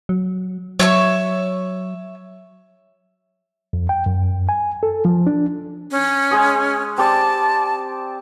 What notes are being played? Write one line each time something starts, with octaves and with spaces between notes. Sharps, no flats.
F#3
F#3 C#5 E5 C#6
F2
G5
F#2
G#5
A4
F3
D4
C#4
G#3 G#4 D#6
C4 G4 D5 A5